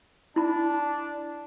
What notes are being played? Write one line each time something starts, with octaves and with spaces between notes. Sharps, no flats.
D4 E4 B5